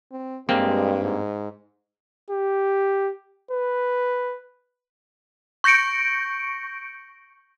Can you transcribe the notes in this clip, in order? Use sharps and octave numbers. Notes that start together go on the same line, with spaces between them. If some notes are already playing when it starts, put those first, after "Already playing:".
C4
G2 G#3 A#3 C4 G4
G#2
G4
B4
C#6 G6 A#6 C#7 D7